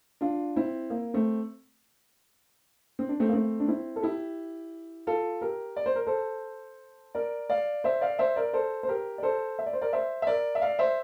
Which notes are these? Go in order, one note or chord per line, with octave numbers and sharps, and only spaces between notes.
D4 F4
C4 E4
A#3
A3 C4
C4
D4
A3 C4
A#3
A3 C4
D4
C4 E4
A4
E4 G4
F4 A4
G4 A#4
D5
C5
A#4
A4 C5
A#4 D5
D5 F5
C5 E5
D5 F5
C5 E5
A#4 D5
A4 C5
C5
G4 A#4
D5
A4 C5
E5
D5
C5
A#4 D5
C5 E5
E5
A#4 D5
E5
D5 F5
C5 E5